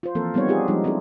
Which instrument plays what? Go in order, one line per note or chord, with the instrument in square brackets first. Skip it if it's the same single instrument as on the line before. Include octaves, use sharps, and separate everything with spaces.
[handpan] F4 C5
E3 F3 A#3 C4 A4 A#4
G3 B3 C4 D#4 C#5
D#4 F4 G4 G#4
F3 G3 G#3 D4 D#4 F4
C4 D4 E4 F4 G#4 A4